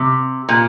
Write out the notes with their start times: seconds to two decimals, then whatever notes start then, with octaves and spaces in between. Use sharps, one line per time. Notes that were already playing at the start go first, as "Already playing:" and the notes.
Already playing: C3
0.49 A#2